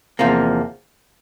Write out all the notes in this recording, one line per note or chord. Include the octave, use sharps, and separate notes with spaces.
E2 C3 F3 A#3